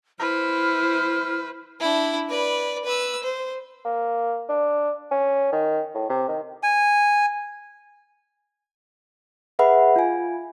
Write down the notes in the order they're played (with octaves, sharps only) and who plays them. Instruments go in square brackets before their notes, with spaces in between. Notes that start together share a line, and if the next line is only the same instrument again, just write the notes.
[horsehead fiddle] E4 C5 [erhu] B4 [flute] F6
[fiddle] D4 E4
B4 D5
B4 E6
C5
[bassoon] A#3
D4
C#4
D#3
A2
C3
D#3
[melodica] G#5
[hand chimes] G#4 B4 E5 F#5 B5
F4 G#5